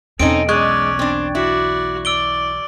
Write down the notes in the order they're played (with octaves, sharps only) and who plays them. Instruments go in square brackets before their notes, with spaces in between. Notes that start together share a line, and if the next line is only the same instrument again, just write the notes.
[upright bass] B1 E2 [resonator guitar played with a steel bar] C4 C#4 D#4 [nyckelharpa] A4 [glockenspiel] D7
[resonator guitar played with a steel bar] G#3 [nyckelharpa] C#4 D5 [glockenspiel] C#6 F#6 G#6
[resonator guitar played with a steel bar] C4 D4
[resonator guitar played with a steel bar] E4 [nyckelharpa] F#4 D5
[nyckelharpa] D5 [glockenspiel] E6 D7 G7